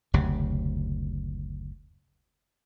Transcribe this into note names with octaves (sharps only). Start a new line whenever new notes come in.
F#1 D2 C3